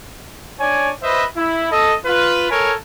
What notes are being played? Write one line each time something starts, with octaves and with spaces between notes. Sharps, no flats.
D4 C#5 D5 G#5
B4 C5 D#5 E5
E4
A4 D#5
F4 B4
A4 A#4 C#5 G#5